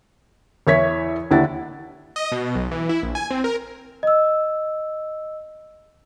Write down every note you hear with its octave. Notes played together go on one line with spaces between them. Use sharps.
E2 E3 C#5 E5 G#6 B6
D#2 D3 E4 F#5 A6
D#5
B2
B1
E3
E4
A#1
G#5
C4
A#4
D#5 E6